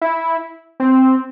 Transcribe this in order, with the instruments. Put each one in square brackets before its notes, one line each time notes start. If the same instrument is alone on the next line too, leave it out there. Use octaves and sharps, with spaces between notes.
[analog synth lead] E4
C4